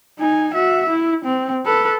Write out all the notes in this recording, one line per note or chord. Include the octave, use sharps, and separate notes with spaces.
D#4 G#5
F#4 E5
E4
C4
A4 B4